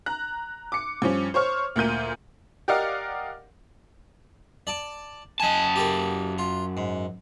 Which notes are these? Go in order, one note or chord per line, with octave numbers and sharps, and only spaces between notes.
A#5 F#6
D6 C#7
G2 F3 C#4
C5 C#5 C#6 F6
D2 A#2 A#3 G6 D#7
G4 A#4 D5 D#5 F5 F#5
D5 A5 D6
F#2 D#5 G#5 A5
G4 A4 A#4
F4
G#2